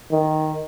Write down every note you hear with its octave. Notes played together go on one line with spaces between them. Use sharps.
D#3